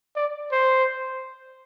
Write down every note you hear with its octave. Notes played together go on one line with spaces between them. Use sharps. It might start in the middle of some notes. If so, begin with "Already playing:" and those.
D5
C5